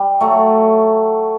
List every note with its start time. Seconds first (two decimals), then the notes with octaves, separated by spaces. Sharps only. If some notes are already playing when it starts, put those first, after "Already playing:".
Already playing: G3
0.21 F#3 A3